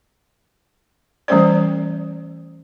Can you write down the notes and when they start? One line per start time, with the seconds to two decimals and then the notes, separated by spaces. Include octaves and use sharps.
1.28 E3 G3 A3 C#4 C5 D5